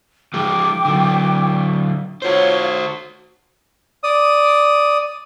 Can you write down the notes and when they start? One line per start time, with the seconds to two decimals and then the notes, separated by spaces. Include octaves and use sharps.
0.34 F3 G#3 G5 D6
0.85 D3 F#3
2.22 F4 F#4 C5 C#5
4.04 D5 D#6